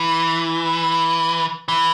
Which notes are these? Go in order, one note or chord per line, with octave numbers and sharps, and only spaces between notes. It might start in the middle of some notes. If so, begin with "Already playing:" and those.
Already playing: E3
E3